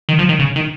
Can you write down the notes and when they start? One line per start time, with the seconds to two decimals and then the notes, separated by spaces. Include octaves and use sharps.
0.09 D#3
0.19 F3
0.29 D#3
0.39 C#3
0.56 D#3